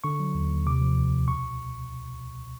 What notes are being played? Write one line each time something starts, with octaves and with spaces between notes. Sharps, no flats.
D3 C#6
F#3
D#2
D#2
C3 D6
F3
C#2
C#2
B2 C#6